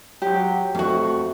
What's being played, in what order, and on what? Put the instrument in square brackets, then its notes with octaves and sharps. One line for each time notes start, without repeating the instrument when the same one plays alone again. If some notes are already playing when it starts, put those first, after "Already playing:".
[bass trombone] F#3 [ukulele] G4
[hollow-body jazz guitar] F2 F#4 [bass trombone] A3